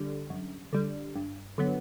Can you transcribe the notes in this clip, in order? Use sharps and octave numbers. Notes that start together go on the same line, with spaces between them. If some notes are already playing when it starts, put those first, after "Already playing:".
Already playing: D3 G3
F#2
D3 G3
G2
D3 F#3 B3